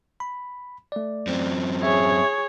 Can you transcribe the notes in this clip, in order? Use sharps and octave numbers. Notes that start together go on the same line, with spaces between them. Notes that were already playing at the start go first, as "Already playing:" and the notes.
B5
A3 D5
F#2 C4
G#4 C#5 E5